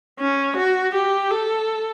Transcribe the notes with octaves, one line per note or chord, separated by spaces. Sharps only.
C#4
F#4
G4
A4